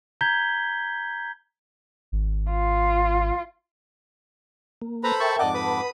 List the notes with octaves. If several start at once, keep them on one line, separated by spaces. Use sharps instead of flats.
A#5 G6 G#6 B6 G7
G#1
F4
A#3
A4 B4 C5 A#5 B5
A#4 E5 G5 A5 C#6
F2 G#2 D5 D#5 F#5 A5 D6
B4 B5 D#6